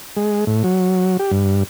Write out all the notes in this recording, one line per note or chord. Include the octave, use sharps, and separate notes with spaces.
G#3
A2
F#3
G4
G2